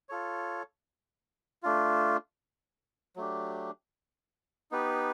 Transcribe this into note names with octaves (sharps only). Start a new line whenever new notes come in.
F4 A4 C#5
A3 D4 F4
F#3 A3 D4 G4
B3 D#4 G4 B4